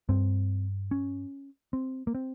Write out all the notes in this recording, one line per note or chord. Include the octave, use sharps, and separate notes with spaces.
G2 C4
C#4
C4
A#3
C4